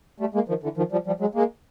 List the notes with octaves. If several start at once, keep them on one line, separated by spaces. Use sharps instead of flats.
G3 A3
G#3 A#3
D#3 F3
D3 E3
D#3 F3
F3 G3
F3 G3
F#3 G#3
G#3 A#3